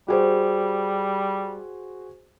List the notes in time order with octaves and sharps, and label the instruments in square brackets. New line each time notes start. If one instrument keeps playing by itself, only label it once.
[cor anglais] G3 [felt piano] F#4 G#4 C5